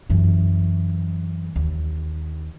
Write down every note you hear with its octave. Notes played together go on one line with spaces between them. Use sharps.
F#2 E3
D#2